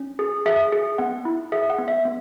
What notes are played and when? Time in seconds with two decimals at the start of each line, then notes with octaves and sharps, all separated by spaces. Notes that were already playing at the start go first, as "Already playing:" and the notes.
Already playing: C#4
0.19 G#4
0.46 G#4 E5
0.72 G#4
0.98 B3 F#5
1.25 E4
1.52 G#4 E5
1.70 F#5
1.78 B3
1.88 E5
2.05 B3